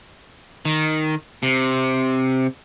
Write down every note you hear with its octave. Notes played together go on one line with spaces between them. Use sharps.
D#3
C3